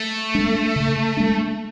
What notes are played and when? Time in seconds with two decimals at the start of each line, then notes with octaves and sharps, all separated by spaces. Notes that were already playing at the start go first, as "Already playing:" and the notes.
Already playing: A3
0.35 G#3 D4
0.76 C#3
1.17 G#3 D4